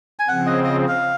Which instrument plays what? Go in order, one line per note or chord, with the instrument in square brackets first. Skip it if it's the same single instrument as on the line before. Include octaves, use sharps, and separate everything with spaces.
[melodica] G#5
[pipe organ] C#3 F3 C4 [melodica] F#5
[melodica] D#5
D#5
F5